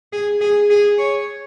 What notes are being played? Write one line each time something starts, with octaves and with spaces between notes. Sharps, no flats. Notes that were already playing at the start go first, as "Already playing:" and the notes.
G#4
G#4
G#4
C#5